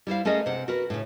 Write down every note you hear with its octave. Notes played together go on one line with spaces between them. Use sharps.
G3 E4 C5 F5
A3 C#4 G#4 A#4 D#5
C3 F#5
F#4 A#4 B4
A2 C#3